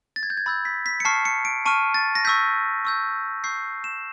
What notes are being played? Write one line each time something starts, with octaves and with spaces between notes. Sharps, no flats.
A6
G#6
G6
G#6
B5 E6 G6 A6
B6
B6
C#7
A5 C#6 F6 C7
C#7
D7
A5 C#6 F6 D#7
A6
A#6
C#6 E6 G6 B6
C#6 E6 G6
C#6 E6 G6 C7
E7